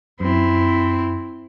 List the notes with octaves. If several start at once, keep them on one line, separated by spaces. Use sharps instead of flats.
F#2 C4 E4